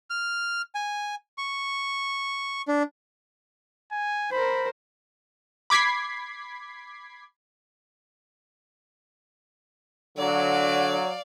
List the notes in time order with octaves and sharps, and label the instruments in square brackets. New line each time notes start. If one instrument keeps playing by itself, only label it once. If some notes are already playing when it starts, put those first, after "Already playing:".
[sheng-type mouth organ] F6
G#5
C#6
D4
[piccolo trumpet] G#5
[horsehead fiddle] A#4 C5 [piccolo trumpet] B5
[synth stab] B5 D6 G#6 B6 C7
[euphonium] D3 [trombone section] F#3 [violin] D5 F5